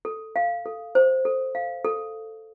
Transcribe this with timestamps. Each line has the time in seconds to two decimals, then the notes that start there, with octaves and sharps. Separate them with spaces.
0.05 A4
0.36 F5
0.66 A4
0.95 C5
1.25 A4
1.55 F5
1.85 A4